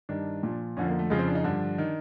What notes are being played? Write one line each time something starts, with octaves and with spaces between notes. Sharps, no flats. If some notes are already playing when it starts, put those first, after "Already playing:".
G2 D#3 D4
A#2 F3
F2 D3 F3 C#4
A#3
A3
F2 C#3 F3 G#3
C4
D4
D#4
G2 D3 F3 D4
D#3